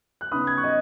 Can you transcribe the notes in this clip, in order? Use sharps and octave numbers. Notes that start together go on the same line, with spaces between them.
F#6
C#3 B3 D#4 B5 D#6
G#6
C#6 F#6
D#5